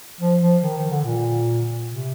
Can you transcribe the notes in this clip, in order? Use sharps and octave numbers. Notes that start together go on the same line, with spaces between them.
F3
F3
D#3
D#3
D3
A#2
C3